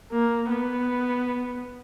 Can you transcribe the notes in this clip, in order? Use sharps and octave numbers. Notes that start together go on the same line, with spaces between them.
A#3
B3